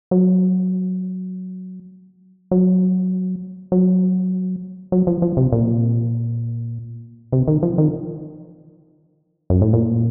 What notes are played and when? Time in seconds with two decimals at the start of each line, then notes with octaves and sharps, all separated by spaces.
0.11 F#3
2.51 F#3
3.72 F#3
4.92 F#3
5.07 F3
5.22 F3
5.37 C3
5.53 A#2
7.32 C3
7.48 D#3
7.63 F3
7.78 D#3
9.50 F#2
9.62 A2
9.73 A#2